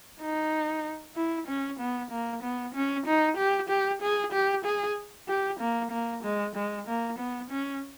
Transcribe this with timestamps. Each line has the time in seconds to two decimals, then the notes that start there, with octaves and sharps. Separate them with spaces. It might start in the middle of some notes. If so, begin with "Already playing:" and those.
0.21 D#4
1.16 E4
1.47 C#4
1.79 B3
2.11 A#3
2.43 B3
2.74 C#4
3.06 D#4
3.37 G4
3.69 G4
4.02 G#4
4.32 G4
4.65 G#4
5.28 G4
5.60 A#3
5.91 A#3
6.23 G#3
6.56 G#3
6.87 A#3
7.18 B3
7.50 C#4